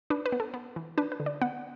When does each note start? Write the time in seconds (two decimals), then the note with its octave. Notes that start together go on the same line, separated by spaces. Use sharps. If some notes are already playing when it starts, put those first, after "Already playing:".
0.10 D4 B4
0.26 B4
0.32 B3
0.40 A4
0.54 B3
0.76 E3
0.98 D4 B4
1.12 B4
1.20 D3
1.26 D5
1.42 B3 F#5